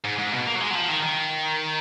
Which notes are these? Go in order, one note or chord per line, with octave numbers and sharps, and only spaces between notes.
G#2
G#2
B2
A#3
F#3
G#3
F#3
F3
D#3
D#3